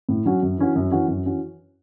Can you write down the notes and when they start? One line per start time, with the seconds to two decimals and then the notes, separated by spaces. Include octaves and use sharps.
0.09 A2
0.25 F#3 C#4 F#4
0.42 F#2
0.58 E3 C#4 F#4
0.76 F#2
0.91 E3 C#4 F#4
1.08 F#2
1.24 E3 C#4 F#4